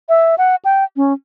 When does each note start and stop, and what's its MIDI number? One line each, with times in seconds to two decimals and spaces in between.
0.09 0.35 76
0.38 0.56 78
0.65 0.84 79
0.96 1.13 61